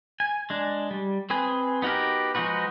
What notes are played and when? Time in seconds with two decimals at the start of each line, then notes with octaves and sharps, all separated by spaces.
0.20 G#5
0.50 G#3 D4
0.91 G3
1.30 C4 G#4 B4 G#5
1.82 B3 D#4 F#4 G4 A#4
2.35 F3 G#3 D#4 F#4 B4